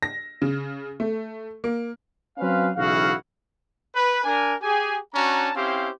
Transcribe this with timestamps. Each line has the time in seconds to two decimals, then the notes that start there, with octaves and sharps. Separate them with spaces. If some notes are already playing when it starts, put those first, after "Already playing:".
0.03 A#6
0.42 C#3
1.00 A3
1.64 A#3
2.38 F#3 C4 C#4 B4 F5
2.76 B1 C#3 E3 E4 F#4 F5
3.95 B4
4.24 D4 A#4 G#5
4.62 G4 G#4 G#5
5.14 C#4 D4 F#4 A5 A#5
5.55 C4 C#4 E4 G4 C5 F5